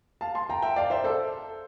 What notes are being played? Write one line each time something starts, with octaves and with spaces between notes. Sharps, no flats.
F5 A5
A5 C6
G5 A#5
E5 G5
D5 F5
C5 E5
A4 C5